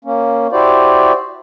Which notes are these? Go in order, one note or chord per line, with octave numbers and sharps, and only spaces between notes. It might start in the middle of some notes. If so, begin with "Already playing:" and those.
A#3 C#4
E4 F#4 G4 C5 D5